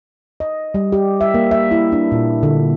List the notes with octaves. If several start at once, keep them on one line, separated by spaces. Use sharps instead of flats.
D#5
G3
G4
E5
A#3
E5
E4
D4
A#2
D3